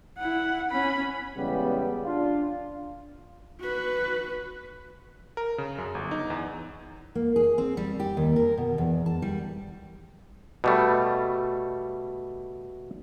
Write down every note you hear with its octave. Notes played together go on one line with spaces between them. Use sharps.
E4 F#5
C#4 B5
E2 C#3 G3 G#3 B3
D4 F4
F#4 B4
A#4
C#3
F#2
G1
D#4
E2
A#3
G#4
C4
G3
G4
D#2
A#4
B2
E2
A5
G3
B2 G3 A3